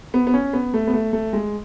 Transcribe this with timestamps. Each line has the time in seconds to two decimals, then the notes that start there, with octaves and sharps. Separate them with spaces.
0.14 B3
0.27 B3
0.34 C#4
0.53 B3
0.74 A3
0.87 B3
0.94 A3
1.13 A3
1.33 G#3